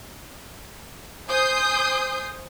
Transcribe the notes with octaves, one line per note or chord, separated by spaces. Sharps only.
C5 G#5 D#6 G6 C7